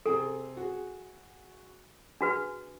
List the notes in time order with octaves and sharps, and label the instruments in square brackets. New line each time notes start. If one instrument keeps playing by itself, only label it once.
[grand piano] C3 C4 G#4 [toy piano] A4
[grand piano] F#4 G#4
[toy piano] D4 F#4 B4 [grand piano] G#4